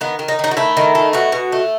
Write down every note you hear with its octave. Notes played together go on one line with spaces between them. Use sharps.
D#3 B3
D#3
D#4
D#3 D#4
F#4
A3 E4
D#3
A3
B2 F#4
B2
A3